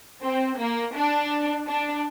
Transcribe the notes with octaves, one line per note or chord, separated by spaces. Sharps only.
C4
A#3
D4
D4